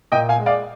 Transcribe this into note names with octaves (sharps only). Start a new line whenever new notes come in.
A#2 D#5 G5
F5 G#5
G#3
D5 F5